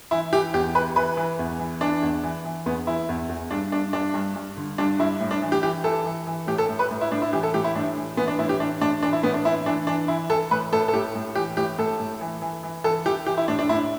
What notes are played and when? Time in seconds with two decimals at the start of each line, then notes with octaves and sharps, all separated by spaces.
0.11 E3 E4
0.33 E3 G4
0.54 E2 G4
0.75 E3 B4
0.96 E3 B4
1.17 E3
1.39 E2
1.59 E3
1.81 E3 D4
2.02 E2
2.23 E3
2.45 E3
2.66 E2 B3
2.87 E3 E4
3.09 E2
3.29 E2
3.51 G2 D4
3.72 G2 D4
3.93 G2 D4
4.14 G2
4.36 G2
4.57 D3
4.78 G2 D4
4.99 G2 E4
5.20 A2
5.31 D4
5.42 E3
5.52 G4
5.63 E3 G4
5.84 E3 A4
6.06 E3
6.27 E3
6.47 A2 G4
6.58 A4
6.69 A2
6.79 B4
6.90 A2
7.01 E4
7.11 A2 D4
7.22 E4
7.33 E3 G4
7.43 A4
7.54 A2 G4
7.64 E4
7.75 A2 D4
7.97 E3
8.17 E3 B3
8.28 D4
8.39 A2 E4
8.49 G4
8.60 E3 D4
8.81 A2 D4
9.03 E3 D4
9.13 E4
9.23 A2 B3
9.34 D4
9.45 E3 E4
9.66 E3 D4
9.87 E3 D4
10.08 E3 E4
10.30 E3 A4
10.51 A2 B4
10.72 A2 A4
10.88 A4
10.94 A2 G4
11.15 A2
11.35 E3 G4
11.57 A2 G4
11.78 A2 A4
11.99 A2
12.21 E3
12.42 E3
12.63 E3
12.84 E3 A4
13.06 E3 G4
13.26 E3 G4
13.37 E4
13.48 A2 D4
13.59 D4
13.69 A2 E4